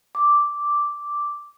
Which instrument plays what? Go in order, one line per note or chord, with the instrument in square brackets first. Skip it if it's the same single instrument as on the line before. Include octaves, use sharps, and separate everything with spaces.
[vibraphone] D6